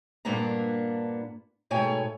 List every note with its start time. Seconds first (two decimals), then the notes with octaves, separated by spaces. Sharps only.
0.25 G2 A#2 A#3 B3 D4 A#5
1.70 G#2 B2 A3 C#5 G5 G#5